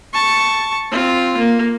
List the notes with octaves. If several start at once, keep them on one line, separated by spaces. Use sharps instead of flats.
A5 C#6
C4 F4
A#3